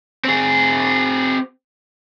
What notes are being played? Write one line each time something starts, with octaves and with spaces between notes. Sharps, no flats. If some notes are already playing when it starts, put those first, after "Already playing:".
C4 G#4